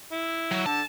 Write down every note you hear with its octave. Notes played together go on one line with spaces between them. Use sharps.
E4
F#3
D3 A5